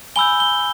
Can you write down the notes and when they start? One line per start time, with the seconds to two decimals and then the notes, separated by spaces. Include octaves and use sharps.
0.16 G#5 B5 E6 G6 G7
0.40 G7